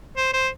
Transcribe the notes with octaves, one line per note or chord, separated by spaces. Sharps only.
C5
C5